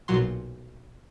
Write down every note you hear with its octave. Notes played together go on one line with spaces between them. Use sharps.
B1 A#2 F#3 C6